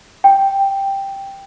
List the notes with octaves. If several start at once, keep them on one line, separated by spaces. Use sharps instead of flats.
G5